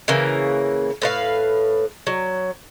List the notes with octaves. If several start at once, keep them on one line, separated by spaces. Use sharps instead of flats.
C#3 E3 A#3
A2 B4 F5
F#3